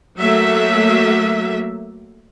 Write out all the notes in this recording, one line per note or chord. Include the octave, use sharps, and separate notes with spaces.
F#3 A3 A#3 E5